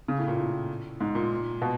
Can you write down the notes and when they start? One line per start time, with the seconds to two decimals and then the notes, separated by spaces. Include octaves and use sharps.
0.08 C#3
0.19 A2
0.28 A#2
0.38 A2
1.00 G#2
1.15 A#2
1.62 B2